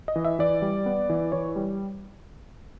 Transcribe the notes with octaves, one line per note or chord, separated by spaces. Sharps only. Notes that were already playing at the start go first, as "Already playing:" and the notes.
D#5
E3
E5
E3 D5
G3
B3
E3
E3 C#5
G3